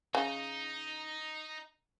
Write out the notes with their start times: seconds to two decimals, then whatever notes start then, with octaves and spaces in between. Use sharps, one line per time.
0.15 C#3 D#4